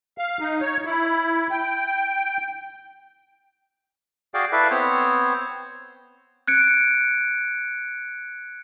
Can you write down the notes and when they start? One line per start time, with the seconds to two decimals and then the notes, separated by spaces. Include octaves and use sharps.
0.18 F5
0.40 D#4
0.61 C#5
0.85 E4
1.51 G5
4.34 F#4 G#4 D5 F5 G5
4.52 E4 A4 B4 D5 E5 F5
4.71 B3 C4 C5 C#5
6.48 F#6 G#6 C#7 D7